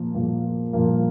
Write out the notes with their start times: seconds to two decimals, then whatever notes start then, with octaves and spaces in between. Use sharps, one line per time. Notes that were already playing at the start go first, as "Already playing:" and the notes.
Already playing: A#2 F3 A#3
0.14 A#2 F3 A#3
0.73 A#2 F3 A#3